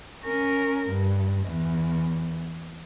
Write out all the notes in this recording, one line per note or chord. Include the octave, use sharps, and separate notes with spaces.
C#4 A#4
G2
E2